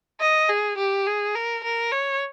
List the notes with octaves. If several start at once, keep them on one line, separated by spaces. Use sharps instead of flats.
D#5
G#4
G4
G#4
A#4
A#4
C#5